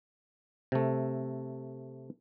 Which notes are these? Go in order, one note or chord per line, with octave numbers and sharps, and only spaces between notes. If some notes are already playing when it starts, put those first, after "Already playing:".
C3 A3